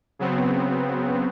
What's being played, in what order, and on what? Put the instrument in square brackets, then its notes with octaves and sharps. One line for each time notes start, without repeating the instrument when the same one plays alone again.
[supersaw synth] C#3 F#3 B3 C4